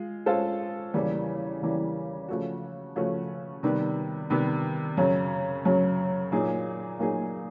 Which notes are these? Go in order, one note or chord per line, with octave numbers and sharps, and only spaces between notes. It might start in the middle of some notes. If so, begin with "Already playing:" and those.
Already playing: G#3 F4
G#3 C#4 F4 A4 C5
E2 C#3 E3 G3 A#3
E2 C#3 E3 G3 A#3
C#3 F3 A3 C#4 F#4
C#3 F3 A3 C#4 F#4
C3 D#3 G3 B3
C3 D#3 G3 B3
F#2 C#3 F#3
F#2 C#3 F#3
A#2 F#3 A#3 D#4 G#4
A#2 F#3 A#3 D#4 G#4